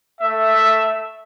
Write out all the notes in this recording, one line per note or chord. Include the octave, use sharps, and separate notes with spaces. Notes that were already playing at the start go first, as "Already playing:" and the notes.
A3 E5